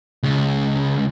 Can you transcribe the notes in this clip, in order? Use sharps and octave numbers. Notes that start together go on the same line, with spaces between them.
C#2 C#3